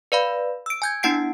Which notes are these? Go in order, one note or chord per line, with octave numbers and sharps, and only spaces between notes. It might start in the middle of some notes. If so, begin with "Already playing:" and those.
B4 D5 F5 B5
E6 D7
G#5 G6 G#6
B3 D4 E4 F#5 C7 D7